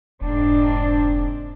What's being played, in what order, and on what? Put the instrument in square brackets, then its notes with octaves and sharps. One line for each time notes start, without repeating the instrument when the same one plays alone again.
[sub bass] F1 [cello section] G#2 C4 D4